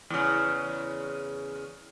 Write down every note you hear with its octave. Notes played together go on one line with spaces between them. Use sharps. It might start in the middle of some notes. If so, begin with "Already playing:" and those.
E2 C#3